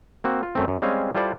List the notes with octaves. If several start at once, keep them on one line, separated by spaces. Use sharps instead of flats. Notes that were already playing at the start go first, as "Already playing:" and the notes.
A#3 C4 F#4
F4
F#2 A3 C4
F#2
G3 G#3 C4 C#4 F5 G#5
G3 E4 F4 A4 C5 D5